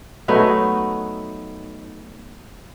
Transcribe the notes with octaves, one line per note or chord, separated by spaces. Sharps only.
F#3 A3 B3 D#4